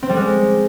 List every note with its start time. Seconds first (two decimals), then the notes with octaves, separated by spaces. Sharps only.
0.03 C4
0.09 G3
0.16 G#3